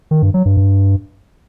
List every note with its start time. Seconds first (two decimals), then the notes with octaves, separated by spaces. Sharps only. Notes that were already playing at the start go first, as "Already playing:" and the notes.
0.11 D#3
0.22 G2
0.34 F#3
0.45 G2
0.57 G2